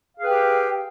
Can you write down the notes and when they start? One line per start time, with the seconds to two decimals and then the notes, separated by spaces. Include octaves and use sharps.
0.15 F5
0.19 G#4
0.23 B4
0.27 G5
0.31 G4